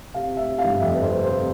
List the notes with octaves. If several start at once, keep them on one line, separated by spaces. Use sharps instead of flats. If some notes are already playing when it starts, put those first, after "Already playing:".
C3 F5
C3
E5
C3
F5
G1
F2 E5
F2 B4
C5
C3
C5
C3